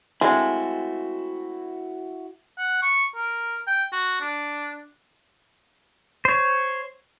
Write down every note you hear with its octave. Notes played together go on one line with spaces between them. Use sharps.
G#3 A3 C4 E4 F#4
F#5
C#6
A#4
G5
F#4
D4
C5 C#5